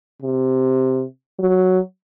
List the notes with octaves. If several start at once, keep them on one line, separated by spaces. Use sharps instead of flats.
C3
F#3